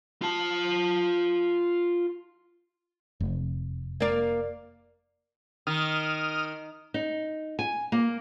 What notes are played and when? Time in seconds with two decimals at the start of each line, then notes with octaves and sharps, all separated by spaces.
0.22 F4 A5
3.20 F1
4.00 A#3 D5
5.67 D#3 D#6 F6
6.94 D#4
7.59 G#5
7.92 A#3